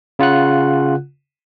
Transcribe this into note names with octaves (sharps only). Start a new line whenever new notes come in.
C#3 F4 F#5 F#6